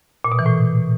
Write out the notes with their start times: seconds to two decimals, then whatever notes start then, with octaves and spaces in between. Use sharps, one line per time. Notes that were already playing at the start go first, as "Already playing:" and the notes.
0.24 A#2
0.32 B2
0.39 E3
0.46 A2